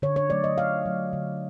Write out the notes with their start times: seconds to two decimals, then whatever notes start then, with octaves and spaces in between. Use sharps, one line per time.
0.02 D3 C#5
0.16 C#5
0.30 F#3 A3 D5
0.44 D#5
0.58 D3 F5
0.86 F#3 A3
1.13 D3